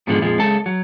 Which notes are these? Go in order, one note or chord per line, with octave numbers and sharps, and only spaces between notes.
G#2 B2 D3 F3 G#3
F2 A#2 F3 G#3
C#3 G#3 A4 A5
F#3